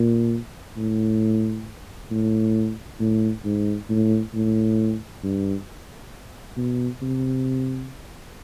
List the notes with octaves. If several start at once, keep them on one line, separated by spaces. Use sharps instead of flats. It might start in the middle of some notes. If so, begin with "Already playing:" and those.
Already playing: A#2
A2
A2
A2
G#2
A2
A2
G2
B2
C3